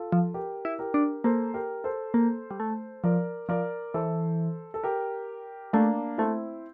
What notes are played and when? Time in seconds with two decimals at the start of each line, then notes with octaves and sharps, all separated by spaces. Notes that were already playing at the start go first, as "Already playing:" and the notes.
Already playing: F4 A4
0.12 F3
0.34 G4 A#4
0.65 E4
0.79 G4 A#4
0.94 D4
1.24 A#3 A4 C5
1.54 G4 A#4
1.84 A4 C5
2.14 A#3
2.51 G3
2.60 A3
3.04 F3 A#4 D5
3.49 F3 A#4 D5
3.94 E3 A4 C5
4.74 A4
4.83 G4 A#4
5.73 A3 A#3 D4
6.18 A3 C4 E4